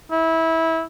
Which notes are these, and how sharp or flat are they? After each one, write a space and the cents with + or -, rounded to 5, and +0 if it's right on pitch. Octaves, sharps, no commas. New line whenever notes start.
E4 -20